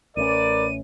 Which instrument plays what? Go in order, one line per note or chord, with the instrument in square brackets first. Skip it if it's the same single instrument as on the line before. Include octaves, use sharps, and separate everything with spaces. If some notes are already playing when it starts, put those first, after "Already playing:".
[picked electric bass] A1 A3 C#4 [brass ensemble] A#4 B4 D5 [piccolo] D#7